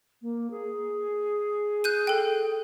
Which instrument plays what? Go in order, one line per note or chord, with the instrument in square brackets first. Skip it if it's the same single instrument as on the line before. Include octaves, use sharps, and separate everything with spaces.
[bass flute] A#3
G#4
[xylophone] F#6 G6 D#7
A4 G5